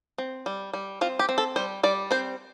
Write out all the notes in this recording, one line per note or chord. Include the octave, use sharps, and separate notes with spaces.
C4
G3
G3
C4 F4
G4
C4
A4
G3 C5
G3 D5
C4 C5